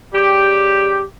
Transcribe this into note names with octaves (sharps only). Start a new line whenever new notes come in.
C#3 G3 G4